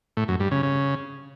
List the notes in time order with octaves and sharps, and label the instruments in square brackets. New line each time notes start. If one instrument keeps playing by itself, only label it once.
[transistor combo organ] A2
F#2
G2
C#3
C#3